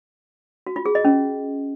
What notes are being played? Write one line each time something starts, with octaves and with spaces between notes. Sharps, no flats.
F#4
F4
G#4
D#5
C#4